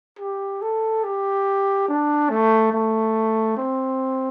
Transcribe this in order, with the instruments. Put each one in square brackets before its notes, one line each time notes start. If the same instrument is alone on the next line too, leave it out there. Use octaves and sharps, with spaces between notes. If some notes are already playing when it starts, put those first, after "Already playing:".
[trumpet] G4
A4
G4
D4
A3
A3
C4